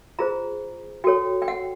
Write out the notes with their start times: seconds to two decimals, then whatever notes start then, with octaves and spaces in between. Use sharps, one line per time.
0.19 F4 G#4 C5 A#5
1.04 F#4 A4 C#5 G5
1.42 G5
1.48 F#5